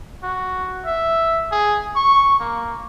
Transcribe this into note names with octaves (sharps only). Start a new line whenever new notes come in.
F#4
E5
G#4
C#6
A#3